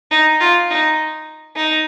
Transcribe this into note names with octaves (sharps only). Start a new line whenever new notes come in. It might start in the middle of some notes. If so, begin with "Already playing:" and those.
D#4
F4
D#4
D#4